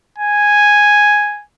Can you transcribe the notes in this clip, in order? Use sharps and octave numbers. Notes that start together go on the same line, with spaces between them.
G#5